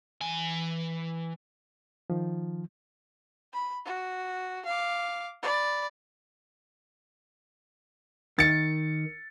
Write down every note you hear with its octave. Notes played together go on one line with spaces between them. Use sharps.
E3 G#5
D#3 F3
B5
F#4
F5 D6
D5 B5
D#3 A6 C#7